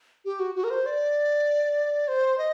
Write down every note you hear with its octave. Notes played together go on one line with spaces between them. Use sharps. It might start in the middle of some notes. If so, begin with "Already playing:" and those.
G4
F#4
F#4
A#4
C5
D5
C5
D#5